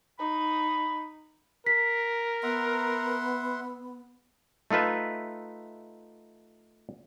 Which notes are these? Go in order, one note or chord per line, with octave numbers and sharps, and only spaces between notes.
D#4 B5
A#4 B6
B3 E5 F#5 C6
A3 D#4 F4 B4 E5